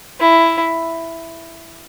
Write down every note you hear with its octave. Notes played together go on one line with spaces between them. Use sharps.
E4